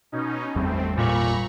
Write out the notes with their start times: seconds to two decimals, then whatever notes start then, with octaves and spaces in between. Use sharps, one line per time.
0.12 B2 C#4 D#4
0.55 G#1 E2 G3 A3 C4
0.98 A#2 A#5 B5 C#6